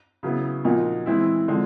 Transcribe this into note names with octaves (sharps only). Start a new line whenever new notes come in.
C#3 F#3 B3 E4
A#2 F3 A#3 D#4 F#4
E3 G#3 C4 E4
D3 F3 G#3 C4